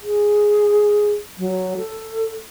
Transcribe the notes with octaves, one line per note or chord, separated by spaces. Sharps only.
G#4
F#3
A4